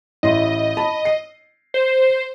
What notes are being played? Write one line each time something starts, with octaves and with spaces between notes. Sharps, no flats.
A1 E4 D#5 C6
A5 B5
C7
C5